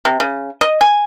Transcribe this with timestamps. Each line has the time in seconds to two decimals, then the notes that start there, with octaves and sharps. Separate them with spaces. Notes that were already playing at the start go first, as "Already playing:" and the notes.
0.05 C3
0.20 C#3
0.61 D#5
0.81 G#5